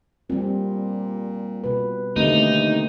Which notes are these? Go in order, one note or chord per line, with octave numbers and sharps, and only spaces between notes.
A#2 G3 C4
B2 B4
D#2 D3 A3 C4 D#4